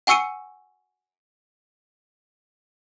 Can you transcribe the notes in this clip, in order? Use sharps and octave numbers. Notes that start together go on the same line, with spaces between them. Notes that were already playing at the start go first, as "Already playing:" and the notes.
F#5 G#5 C#6 E6 C#7 D#7